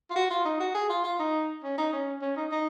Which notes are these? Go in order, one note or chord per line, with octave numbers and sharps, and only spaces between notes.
F4
F#4
F4
D#4
F#4
G#4
F4
F4
D#4
C#4
D#4
C#4
C#4
D#4
D#4